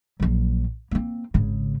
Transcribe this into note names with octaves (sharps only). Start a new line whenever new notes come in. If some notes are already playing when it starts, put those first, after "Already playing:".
A#1 F#3
A#3 C4
G#1 C#3